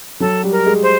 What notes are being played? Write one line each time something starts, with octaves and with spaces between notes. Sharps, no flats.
F#3 A4
G3
A#4
G#3
C5